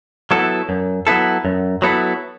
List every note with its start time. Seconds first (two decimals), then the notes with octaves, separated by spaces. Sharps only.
0.31 F#3 B3 E4 A4
0.69 F#2
1.07 F#3 B3 E4 A4
1.45 F#2
1.82 F#3 B3 E4 A4